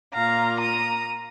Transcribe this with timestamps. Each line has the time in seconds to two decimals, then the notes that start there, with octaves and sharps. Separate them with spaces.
0.14 A#2 A#3 F4 F5 A#5
0.61 A#5 D#6